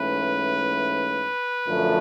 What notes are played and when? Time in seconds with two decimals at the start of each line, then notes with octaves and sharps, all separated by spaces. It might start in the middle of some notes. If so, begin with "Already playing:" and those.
Already playing: G#2 E3 A3 C#4 B4
1.67 F#2 D3 F3 A3